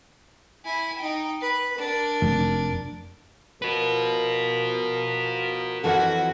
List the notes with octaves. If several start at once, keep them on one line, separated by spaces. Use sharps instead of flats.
E4 G#5
D#4 G5
B4
D4 A#4
F1
F3 F#4 A#4 B4
F2 E3 F#4 A4